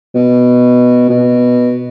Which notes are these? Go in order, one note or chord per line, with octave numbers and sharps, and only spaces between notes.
B2
B2